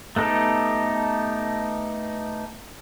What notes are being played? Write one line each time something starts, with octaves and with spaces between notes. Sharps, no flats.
A3 B3 D#4 G4 A4